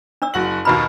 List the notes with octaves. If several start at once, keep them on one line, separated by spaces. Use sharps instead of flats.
D4 D5 E6
F#1 F#4 F#7
D#2 B2 A#5 B5 F6